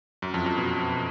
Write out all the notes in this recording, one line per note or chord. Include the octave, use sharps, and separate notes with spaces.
F#2
F2
F2
B2